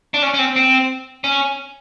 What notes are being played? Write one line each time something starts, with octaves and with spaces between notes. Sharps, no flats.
D4
C#4
C#4
C4
C4
C#4